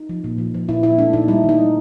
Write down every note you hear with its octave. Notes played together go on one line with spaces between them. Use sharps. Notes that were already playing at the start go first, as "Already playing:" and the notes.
Already playing: D#4
F3
A#2
F3
F3
A#2 E4
A#2 E4
A3 D4
A#2 D#4
G3 E4
D#3
D#4
G3